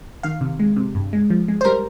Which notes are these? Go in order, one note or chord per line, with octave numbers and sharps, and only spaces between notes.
D#3 F5
C3
G#3
C3
G2
G#3
F3
G#3
C5
G3 A#4